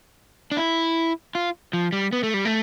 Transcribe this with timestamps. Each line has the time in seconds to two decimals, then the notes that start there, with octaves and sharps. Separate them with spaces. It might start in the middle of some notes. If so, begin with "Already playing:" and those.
0.52 D4
0.57 E4
1.35 F4
1.73 F3
1.92 G3
2.13 B3
2.23 A3
2.34 G3
2.45 A3